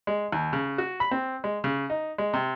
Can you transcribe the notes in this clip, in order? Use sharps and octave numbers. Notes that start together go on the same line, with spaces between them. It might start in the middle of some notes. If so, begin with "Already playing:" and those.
G#3
D#2
C#3
F#4
B5
C4
G#3
C#3
D#4
G#3
C3